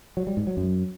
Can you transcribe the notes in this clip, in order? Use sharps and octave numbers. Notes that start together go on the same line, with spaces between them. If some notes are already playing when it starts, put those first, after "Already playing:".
F#3
G3
G#2
F#3
F#2